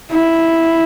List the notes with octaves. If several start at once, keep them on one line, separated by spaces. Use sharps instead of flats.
E4